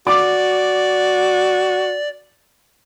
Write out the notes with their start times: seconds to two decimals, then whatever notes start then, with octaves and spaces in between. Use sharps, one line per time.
0.07 F#4 D5 D6